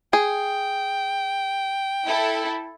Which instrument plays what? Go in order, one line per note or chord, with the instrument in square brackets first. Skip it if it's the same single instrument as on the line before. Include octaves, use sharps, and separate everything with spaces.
[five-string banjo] G#4 [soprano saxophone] G5
[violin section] E4 A4